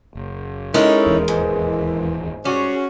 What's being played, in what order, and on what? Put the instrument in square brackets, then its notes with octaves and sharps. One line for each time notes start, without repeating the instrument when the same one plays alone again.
[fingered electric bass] F#1
[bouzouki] G#3 A#4 [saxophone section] C#4 D#4 [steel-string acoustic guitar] E4 A4 C#5
[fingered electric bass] D#1 G#1 E2
[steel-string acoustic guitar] G#2 [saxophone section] E3
[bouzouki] G3 G#4 [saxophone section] C#4 F#4